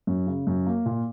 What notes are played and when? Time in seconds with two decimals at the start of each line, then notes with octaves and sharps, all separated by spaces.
0.07 F#2
0.27 C#3
0.47 F#2
0.66 A#3
0.86 A#2